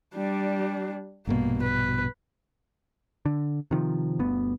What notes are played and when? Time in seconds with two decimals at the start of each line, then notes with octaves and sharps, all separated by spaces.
0.15 G3 D4
1.27 A#1 G2 B2 A#3
1.63 B4
3.26 D3
3.71 C3 D#3 F3
4.19 G1 D2 B3